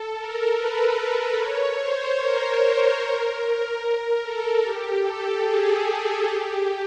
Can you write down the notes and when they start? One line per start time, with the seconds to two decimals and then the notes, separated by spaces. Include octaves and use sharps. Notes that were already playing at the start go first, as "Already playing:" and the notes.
Already playing: A4
0.17 A#4
0.57 B4
1.37 C#5
1.78 C5
2.19 A#4
3.81 A#4
4.21 A4
4.62 G4
5.02 A4
5.43 G#4
6.23 G4